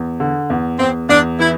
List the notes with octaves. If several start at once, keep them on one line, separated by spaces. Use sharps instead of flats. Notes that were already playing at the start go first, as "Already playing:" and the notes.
Already playing: E2
D3
E2
E2 C4
E2 D4
E3 E4